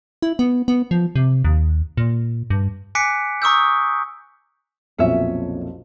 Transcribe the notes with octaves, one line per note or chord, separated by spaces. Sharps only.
E4
B3
B3
F3
C3
D#2
A#2
G2
G#5 D6 F#6 B6 C#7 D7
A#5 C#6 D#6 E6 G6
B1 F2 A#2 C#4 E5